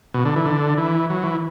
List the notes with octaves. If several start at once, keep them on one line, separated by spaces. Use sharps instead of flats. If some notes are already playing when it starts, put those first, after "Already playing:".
B2
D3
E3
D3
E3
F#3
E3